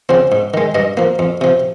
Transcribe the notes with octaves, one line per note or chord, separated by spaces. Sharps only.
C#3 F3 C4
G#2
D#3 G#3
G2 D#5
F3 A#3
F2
C3 F3